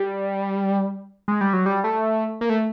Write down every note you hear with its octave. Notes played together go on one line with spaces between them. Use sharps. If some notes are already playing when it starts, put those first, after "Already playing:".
Already playing: G3
G#3
G3
F#3
G3
A3
A#3
A3